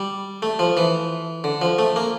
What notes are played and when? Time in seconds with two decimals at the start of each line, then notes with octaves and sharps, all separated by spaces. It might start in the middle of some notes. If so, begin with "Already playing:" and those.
Already playing: G3
0.42 A3
0.59 F3
0.77 E3
1.44 D3
1.62 F3
1.79 A3
1.96 A#3